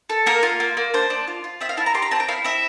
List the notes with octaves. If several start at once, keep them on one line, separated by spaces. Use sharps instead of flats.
A4
A#3 A#4
F4
A#3
A#3
D4 C5
D4
F4
F4
C4 E5
F5
E4 A5
A#5
G4 C6
A#5
C4 A5
G5
E4 F5
C4 E5